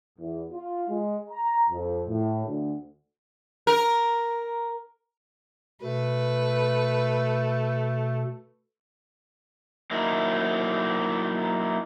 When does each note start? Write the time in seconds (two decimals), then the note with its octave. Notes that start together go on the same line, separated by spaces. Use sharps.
0.19 E2
0.52 F4
0.89 G#3
1.31 A#5
1.70 F2
2.08 A2
2.46 D2
3.67 A#4
5.83 B2 A3 B4
9.91 F#3 A#3 D#4 E4